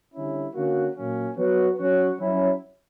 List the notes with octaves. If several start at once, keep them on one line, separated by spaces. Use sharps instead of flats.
D3 G3 C#4 E4
D3 A#3 C#4 F#4
A#2 F#3 A#3 C#4
F#3 B3 F#4
F#3 C#4 F#4
F#3 C#4 E4